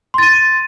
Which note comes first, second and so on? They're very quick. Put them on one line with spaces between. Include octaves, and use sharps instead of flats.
C6 A6 D#7